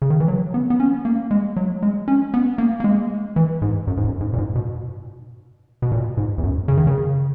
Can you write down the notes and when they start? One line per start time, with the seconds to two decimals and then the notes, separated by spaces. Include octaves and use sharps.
0.02 C#3
0.10 D#3
0.20 E3
0.28 F#3
0.54 B3
0.70 B3
0.80 C#4
1.05 A#3
1.31 G#3
1.56 F#3
1.82 G#3
2.08 C#4
2.34 B3
2.58 A#3
2.80 A#3
2.84 G#3
3.36 E3
3.62 G#2
3.87 F#2
3.97 G#2
4.04 F#2
4.21 G#2
4.33 A#2
4.38 G#2
4.55 B2
5.82 B2
5.92 A#2
6.17 G#2
6.38 E2
6.43 F#2
6.68 C#3
6.78 D#3
6.87 C#3